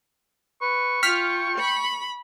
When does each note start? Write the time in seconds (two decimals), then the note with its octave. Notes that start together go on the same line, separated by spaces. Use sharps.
0.62 B4 C#6
1.03 F4 G5 F6 B6
1.58 B5